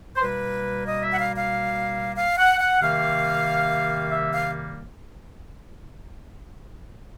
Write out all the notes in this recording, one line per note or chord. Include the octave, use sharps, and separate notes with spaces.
C5
B2 G3 A#3 B4
D#5
E5
F#5
F5
F5
F5
F#5
F#5
C3 D#3 G3 A#3 F5
E5
F5